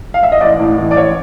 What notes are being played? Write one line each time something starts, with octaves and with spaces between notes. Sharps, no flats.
F5
E5
D#5
A1 D5
A2
E3
D5
A1 C#5